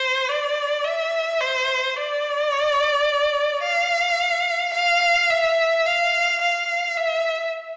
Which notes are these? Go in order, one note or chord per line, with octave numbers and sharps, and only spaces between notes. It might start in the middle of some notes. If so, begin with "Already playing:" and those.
Already playing: C5
D5
E5
C5
D5
F5
F5
E5
F5
F5
E5